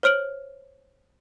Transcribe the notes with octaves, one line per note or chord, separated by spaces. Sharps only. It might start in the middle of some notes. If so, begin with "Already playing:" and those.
C5 C#5 F6 D7 F#7